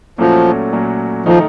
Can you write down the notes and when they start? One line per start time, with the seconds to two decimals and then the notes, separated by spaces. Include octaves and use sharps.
0.18 A#2 F3 F#3 A3 C#4 F#4
0.72 A#2 F#3 A3 C#4 F#4
1.26 D#3 F3 A3 D#4